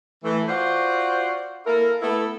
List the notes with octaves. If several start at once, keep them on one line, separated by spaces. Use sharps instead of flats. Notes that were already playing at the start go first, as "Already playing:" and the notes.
E3 A3
F4 F#4 C5 D5 F#5
A#3 E4 A4 A#4
A3 B3 E4 A4